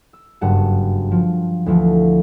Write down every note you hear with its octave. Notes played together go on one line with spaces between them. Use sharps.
E6
F#1 G2 F#5 A5
F3
D2 E3 F3